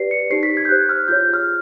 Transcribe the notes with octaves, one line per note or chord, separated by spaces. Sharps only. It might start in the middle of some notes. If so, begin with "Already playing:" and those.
Already playing: G4 B4 D5 C7
C#7
D#4 G4 C5 C7
B6
G#6
G6
G4 C5 F#6
F6
F4 G#4 C#5 G6
G6
F6